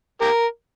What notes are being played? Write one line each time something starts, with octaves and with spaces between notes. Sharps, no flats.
G4 A#4